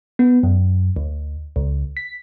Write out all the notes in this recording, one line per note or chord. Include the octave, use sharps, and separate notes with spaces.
B3
F#2
D2
C#2
B6